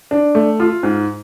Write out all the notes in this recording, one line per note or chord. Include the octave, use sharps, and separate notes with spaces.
D4
A3
F4
G#2